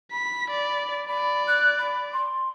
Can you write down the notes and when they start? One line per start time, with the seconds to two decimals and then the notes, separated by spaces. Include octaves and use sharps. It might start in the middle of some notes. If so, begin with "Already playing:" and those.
0.11 B5 B6
0.50 D5
1.08 D5 B5
1.47 F#6
1.79 B5
2.13 C6